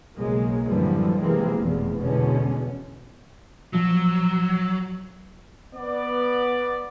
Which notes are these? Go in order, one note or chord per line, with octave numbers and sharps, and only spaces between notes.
B1 C#3 F#3 G#3 A#3
F#2 A2 D3 E3 F3 G3
C3 E3 F3 G#3 A#3 C4
F1 E2 B2
E2 B2 D3 G#3 C#4
A#2 F3 F#3 E6
B3 D5